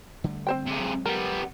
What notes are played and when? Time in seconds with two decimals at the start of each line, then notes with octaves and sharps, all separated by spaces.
0.24 D3 G3 A3
0.47 C4 C5 G5
0.67 C3 G#4
0.80 F#3 G#3
1.06 G3 B3 A#4